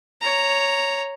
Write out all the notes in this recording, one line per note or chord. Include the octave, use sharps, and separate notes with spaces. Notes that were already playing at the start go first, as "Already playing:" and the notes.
C#5 A#5